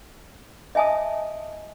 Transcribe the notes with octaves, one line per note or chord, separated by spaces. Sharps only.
D#5 E5 G#5 A5 D#6